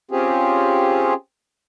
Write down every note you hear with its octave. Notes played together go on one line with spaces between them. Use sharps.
C4 C#4 F4 G4 G#4